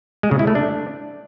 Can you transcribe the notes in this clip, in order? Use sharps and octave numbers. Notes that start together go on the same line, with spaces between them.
G#3
C#3
E4
A3
D4